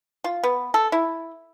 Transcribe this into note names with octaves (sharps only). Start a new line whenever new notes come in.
F4
B3
A4
E4